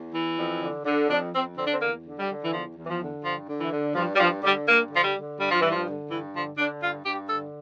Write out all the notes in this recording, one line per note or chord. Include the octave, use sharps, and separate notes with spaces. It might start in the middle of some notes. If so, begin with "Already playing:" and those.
Already playing: E2
E3
F2
D3
D3
F2 D4
F2 C4
D3 C4
D4
C4
E2 A#3
D3
G3
D3
E3
E2 F3
E2
E3
F3
D3
G2 F3
D3
E3
D3
G2 F3
G3
G2 F3
D3 G3
G2 A#3
D3
F3
G3
D3
G2 G3
F3
G2 E3
F3
D3
G2 E3
D3 F3
D3 D4
G2 F4
G2 G4
D3 A4